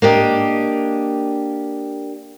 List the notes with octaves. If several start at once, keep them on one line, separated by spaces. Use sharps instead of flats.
A#3 D4 G4 D#5